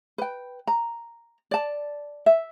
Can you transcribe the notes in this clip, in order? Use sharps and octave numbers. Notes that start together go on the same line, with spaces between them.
B4 G5
A#5
D5 A5
E5